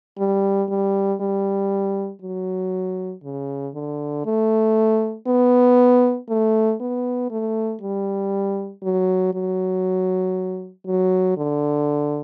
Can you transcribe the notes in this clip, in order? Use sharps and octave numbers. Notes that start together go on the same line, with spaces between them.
G3
G3
G3
F#3
C#3
D3
A3
B3
A3
B3
A3
G3
F#3
F#3
F#3
D3